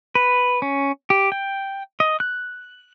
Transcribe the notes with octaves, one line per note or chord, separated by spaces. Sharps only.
B4
C#4
G4
G5
D#5
F#6